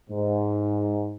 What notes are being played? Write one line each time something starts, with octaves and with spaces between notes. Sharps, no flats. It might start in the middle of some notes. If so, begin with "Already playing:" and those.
G#2